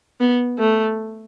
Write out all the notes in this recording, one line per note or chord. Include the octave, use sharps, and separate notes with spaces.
B3
A3